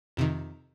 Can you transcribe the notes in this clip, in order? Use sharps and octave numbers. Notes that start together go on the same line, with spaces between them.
F2 C3 D#3